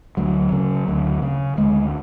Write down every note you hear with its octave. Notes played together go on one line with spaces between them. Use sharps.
D2 F#3
C#3
D2
C#3
D2 G#3